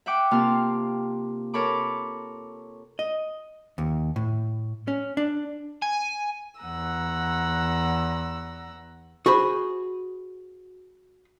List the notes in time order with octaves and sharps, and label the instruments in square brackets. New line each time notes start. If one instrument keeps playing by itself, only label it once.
[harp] E5 F#5 G5 D6
C3 A#3 F4 A5 F6
A4 A#4 C#5 A5 B5 D6
[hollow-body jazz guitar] D#5
D#2
A2
C#4
D4
[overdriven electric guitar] G#5
[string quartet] E2 F#5 A#5 E6
[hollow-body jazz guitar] F#4 G#4 C5 B5